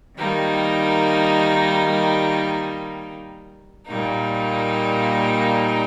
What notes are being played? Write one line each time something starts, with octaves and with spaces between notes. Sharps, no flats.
D#3 G3 A#3 D#4
A#2 G3 A#3 D#4